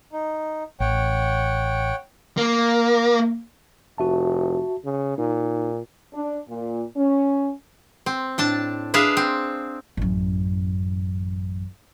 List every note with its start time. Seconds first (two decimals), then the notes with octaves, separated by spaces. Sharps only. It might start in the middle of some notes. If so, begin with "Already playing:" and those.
0.13 D#4
0.80 A1 C#5 F#5 G5
2.37 A#3
3.98 F1 F#4 E5 A5
4.85 C#3
5.18 A#2 D#4
6.14 D4
6.49 A#2
6.96 C#4
8.06 C4
8.38 A2 D4 A5
8.94 D4 G#4 B4 E5 F5
9.17 C4
9.97 A1 F#2